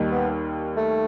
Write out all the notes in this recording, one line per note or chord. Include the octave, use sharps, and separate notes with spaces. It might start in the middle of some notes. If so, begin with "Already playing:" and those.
Already playing: D#2 D#3 G3 A#3
B3
A3